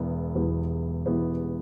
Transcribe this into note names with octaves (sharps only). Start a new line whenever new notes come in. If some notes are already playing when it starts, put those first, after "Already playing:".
Already playing: E1 E2 E3 G#3 B3
E1 E2 E3 G#3 B3
E1 E2 E3 G#3 B3